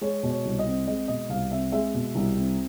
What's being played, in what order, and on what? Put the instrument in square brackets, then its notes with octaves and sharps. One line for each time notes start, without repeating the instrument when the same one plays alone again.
[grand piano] G#3 C#5
B2
C#5
C2
D#5
C4
G#3 D#5
B2 D#5
C2 F5
C4 E5
G#3 E5
B2
C2
C4